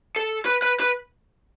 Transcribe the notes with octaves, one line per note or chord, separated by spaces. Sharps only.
A4
B4
B4
B4